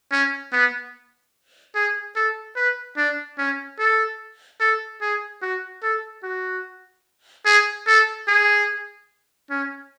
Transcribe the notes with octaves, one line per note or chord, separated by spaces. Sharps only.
C#4
B3
G#4
A4
B4
D4
C#4
A4
A4
G#4
F#4
A4
F#4
G#4
A4
G#4
C#4